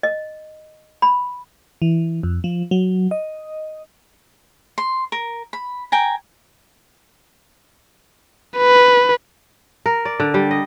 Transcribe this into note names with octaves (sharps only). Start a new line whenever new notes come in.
D#5
B5
E3
F2
F3
F#3
D#5
C6
A#4
B5
G5 G#5 A#5
B4
A#4
D5
D3
G3
D#5